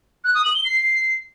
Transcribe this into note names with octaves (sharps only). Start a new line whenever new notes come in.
F#6
D#6
F#7
G7
C7